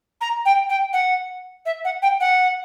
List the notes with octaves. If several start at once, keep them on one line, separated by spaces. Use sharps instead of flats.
A#5
G5
G5
F#5
E5
F#5
G5
F#5